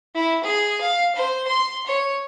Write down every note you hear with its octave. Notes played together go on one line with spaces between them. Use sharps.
E4
G#4
F5
C5
C6
C#5